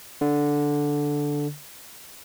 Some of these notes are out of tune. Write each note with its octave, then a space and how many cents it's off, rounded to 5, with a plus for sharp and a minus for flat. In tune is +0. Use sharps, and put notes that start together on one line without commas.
D3 -5